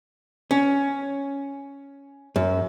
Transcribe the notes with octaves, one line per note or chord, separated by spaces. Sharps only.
C#4
F#2